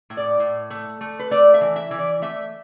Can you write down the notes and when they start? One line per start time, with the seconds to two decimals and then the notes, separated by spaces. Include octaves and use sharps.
0.10 A2
0.17 D5
0.40 A2
0.70 A3
1.01 A3
1.19 B4
1.31 A3 D5
1.54 E5
1.61 E3
1.76 E5
1.91 E3
1.98 D5
2.22 A3 E5